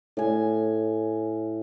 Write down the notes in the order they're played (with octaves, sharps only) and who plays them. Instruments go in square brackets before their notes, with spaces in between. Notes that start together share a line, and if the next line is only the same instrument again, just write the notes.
[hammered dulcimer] A2 G#5